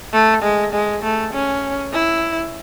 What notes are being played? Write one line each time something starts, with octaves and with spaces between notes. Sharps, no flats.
A3
G#3
G#3
A3
C#4
E4